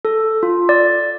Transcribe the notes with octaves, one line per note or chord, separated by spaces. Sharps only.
A4
F4
D5